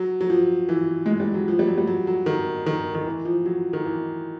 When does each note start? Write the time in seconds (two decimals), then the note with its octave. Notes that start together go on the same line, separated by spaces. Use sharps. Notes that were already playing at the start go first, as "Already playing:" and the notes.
Already playing: F#3
0.21 F#3
0.30 F3
0.69 E3
1.06 G#3
1.20 G3
1.34 F#3
1.48 F3
1.59 G3
1.67 F#3
1.78 G3
1.87 F#3
2.07 F#3
2.26 D#3
2.66 D#3
2.95 D#3
3.06 E3
3.25 F3
3.46 F#3
3.73 D#3
3.85 E3